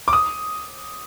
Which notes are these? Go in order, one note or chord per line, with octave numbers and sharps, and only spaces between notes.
D6
D#6